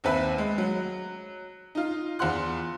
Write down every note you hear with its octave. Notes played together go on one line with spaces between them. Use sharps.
D#2 C4 B4 E5 F#6
G#3
F#3
D#4 F4
E2 F4 F#5 C6 F#6